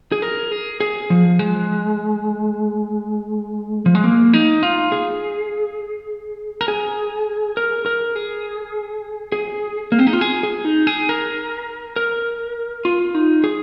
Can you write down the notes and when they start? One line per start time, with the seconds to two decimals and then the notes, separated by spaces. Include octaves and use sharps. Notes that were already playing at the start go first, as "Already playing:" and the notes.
0.12 G#4
0.22 A#4
0.52 G#4
0.80 G#4
1.10 F3
1.39 G#3
3.86 F3
3.95 G#3
4.04 A#3
4.33 D#4
4.63 F4
4.92 G#4
6.61 A#4
6.68 G#4
7.57 A#4
7.86 A#4
8.16 G#4
9.32 G#4
9.92 A#3
9.99 C4
10.07 D#4
10.13 F4
10.21 G#4
10.43 G#4
10.65 D#4
10.87 G#4
11.09 A#4
11.96 A#4
12.85 F4
13.14 D#4
13.44 G#4